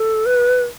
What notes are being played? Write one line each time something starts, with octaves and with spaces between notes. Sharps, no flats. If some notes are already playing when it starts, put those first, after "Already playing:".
Already playing: A4
B4